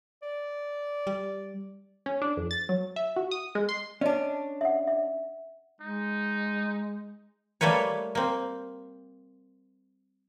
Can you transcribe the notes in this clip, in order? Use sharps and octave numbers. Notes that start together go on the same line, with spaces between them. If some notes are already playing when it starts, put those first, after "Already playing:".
D5
G3
C#4
D4
F2
A6
F#3
E5
F#4
D#6
G#3
C6
C#4 D4 D5 D#5
E5 F#5
E5
G#3 D#4
G3 A3 A#3 B4 C#5
A#3 C4